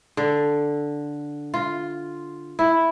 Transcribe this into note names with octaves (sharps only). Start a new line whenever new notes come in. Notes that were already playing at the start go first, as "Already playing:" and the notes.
D3
F4
E4